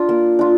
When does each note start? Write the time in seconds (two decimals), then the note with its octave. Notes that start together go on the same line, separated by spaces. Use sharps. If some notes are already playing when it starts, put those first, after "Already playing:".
Already playing: D4 F4
0.09 A#3
0.39 D4 F4